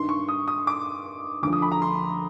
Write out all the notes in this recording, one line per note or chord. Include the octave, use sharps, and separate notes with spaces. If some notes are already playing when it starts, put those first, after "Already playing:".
Already playing: G2 D#3 C6
C#6
D#6
D#6
D6
D2 D3 F3 D6
D#6
B5
A#5
C6